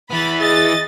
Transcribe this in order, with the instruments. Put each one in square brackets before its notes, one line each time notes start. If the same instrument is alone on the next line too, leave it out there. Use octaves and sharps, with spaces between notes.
[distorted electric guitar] E3 B3 [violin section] B5 A6
[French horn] G#4 [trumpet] D#5 [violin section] A6